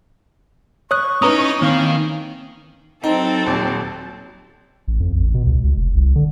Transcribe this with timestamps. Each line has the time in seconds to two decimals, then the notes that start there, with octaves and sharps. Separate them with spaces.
0.91 C#5 C#6 D#6 F#6
1.22 C#4 D#4 E4 B4 A#5 D#6
1.62 D#3 E3 A#3 C4 C#4 F5
3.04 F#3 C4 D#4 A4
3.46 D#1
4.88 A1
5.00 F2
5.14 A1
5.34 B2
5.46 C#2
5.64 C#2
5.77 F1
5.95 C2
6.16 D3